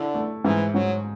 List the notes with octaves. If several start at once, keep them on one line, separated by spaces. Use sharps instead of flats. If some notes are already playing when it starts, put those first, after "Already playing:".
Already playing: D3 E4
A3
G#2 E3
G#2 F#3